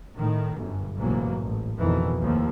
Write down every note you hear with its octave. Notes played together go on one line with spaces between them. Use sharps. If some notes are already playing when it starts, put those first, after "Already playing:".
A2 D#3
G1 F#2
A1 G#2 B2 E3 F#3 A#3
A1
F2 B2 D#3 E3
D#2 A2 F3